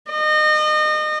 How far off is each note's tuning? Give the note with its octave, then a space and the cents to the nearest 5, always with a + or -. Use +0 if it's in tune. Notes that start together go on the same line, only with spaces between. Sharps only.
D#5 -30